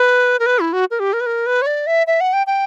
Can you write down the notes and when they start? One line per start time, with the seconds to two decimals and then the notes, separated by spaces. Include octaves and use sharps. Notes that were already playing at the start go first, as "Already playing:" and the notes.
Already playing: B4
0.39 A#4
0.46 B4
0.59 E4
0.73 F#4
0.91 A#4
0.99 G4
1.13 A#4
1.20 B4
1.26 A#4
1.46 B4
1.62 C#5
1.66 D5
1.87 E5
2.07 E5
2.20 F#5
2.33 G5
2.47 G5